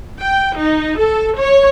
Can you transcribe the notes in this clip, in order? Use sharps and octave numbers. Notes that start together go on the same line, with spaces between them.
G5
D#4
A4
C#5